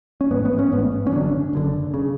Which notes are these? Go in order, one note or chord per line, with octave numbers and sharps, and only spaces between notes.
C#4
A1 G#2 B3
B3
C#4
A1 G#2 B3
C#4
F#1 F#2 D3 D4
F#1 F#2 D3
C#3